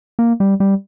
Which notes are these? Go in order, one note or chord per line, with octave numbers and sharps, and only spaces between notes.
A#3
G3
G3